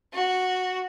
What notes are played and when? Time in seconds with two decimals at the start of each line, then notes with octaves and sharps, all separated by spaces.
0.13 F#4